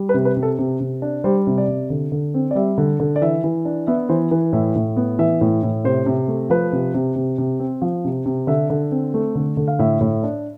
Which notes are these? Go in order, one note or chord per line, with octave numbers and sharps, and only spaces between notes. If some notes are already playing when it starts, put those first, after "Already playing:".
Already playing: G3
B4
C3
B4
C3
A4
C3
C3
D4
G3 C5
C3
D5
C3
D3
D3
C4
D5
G3 E5
D3
D3
D5
E3 E5
E3
D4
B3 E5
E3 C5
E3 B4
A2 E5
A2
B3
E3 E5
A2
A2
C3 C5
C3
A3
F3 B4
C3
C3
C3
C3
C4
F3
C3
C3
D3 E5
D3
C4
A3
D3
D3
F5
A2 E5
A2
D4